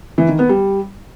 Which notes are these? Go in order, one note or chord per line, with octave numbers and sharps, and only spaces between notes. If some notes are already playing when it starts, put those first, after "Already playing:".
E3
D#3
B3
G3